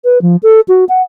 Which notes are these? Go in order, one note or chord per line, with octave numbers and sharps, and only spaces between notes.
B4
F3
A4
F#4
F#5